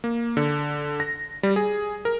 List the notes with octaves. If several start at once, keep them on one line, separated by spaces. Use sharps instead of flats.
A#3
D3
A#6
G3
G#4
A#4